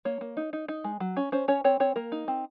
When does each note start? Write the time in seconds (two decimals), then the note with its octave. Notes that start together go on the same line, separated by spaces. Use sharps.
0.05 A#3 C#5
0.21 A#3
0.37 D#4
0.53 D#4
0.68 D#4
0.84 G#3
1.00 F#3
1.17 C#4
1.32 C#4 C5
1.48 C#4 C#5
1.64 C4 C#5
1.80 C4 C#5
1.96 A#3 A#4
2.12 D#4
2.28 C4